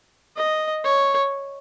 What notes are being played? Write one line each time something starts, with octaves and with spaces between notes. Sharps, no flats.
D#5
C#5